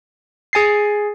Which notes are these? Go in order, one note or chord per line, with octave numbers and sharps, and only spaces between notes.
G#4 G#5 A6 C7